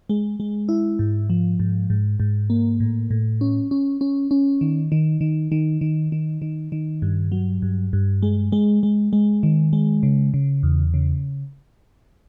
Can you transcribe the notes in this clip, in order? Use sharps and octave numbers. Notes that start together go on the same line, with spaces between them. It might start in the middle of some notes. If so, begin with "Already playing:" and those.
G#3
G#3
E4
G#2
F3
G#2
G#2
G#2
A#3
A2
A2
C#4
C#4
C#4
C#4
D#3
D#3
D#3
D#3
D#3
D#3
D#3
D#3
G2
F#3
G2
G2
G#3
G#3
G#3
G#3
D#3
G#3
C#3
C#3
E2
C#3